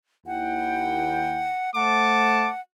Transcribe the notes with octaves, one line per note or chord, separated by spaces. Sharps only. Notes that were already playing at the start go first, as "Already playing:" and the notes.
D#2 E4 F#5 G5
A3 C5 F#5 A5 D6